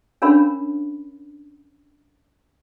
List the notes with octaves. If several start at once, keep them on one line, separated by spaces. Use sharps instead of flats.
C#4 D4 A#4 C#5 F5 B5